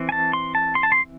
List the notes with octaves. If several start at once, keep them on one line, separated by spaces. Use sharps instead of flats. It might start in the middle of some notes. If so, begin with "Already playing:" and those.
Already playing: E3 C4
G#5
A5
C6
A5
C6
A5
C6